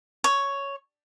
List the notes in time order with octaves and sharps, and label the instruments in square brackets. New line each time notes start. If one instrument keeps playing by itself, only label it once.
[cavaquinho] C#5